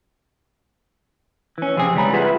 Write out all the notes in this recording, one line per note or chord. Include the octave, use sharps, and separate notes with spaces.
E3 C#4
F2 C3 C4 G#4
C#2 E3 G3 C#4 A#5 B5
F4 G#4 B4 E5 F#5